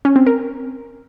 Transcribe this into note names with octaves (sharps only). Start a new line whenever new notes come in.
C#4
C4
A#4